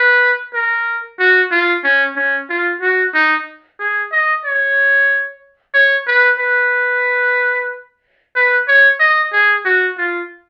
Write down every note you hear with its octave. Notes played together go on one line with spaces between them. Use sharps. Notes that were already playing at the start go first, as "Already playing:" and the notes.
Already playing: B4
A#4
F#4
F4
C#4
C#4
F4
F#4
D#4
G#4
D#5
C#5
C#5
B4
B4
B4
C#5
D#5
G#4
F#4
F4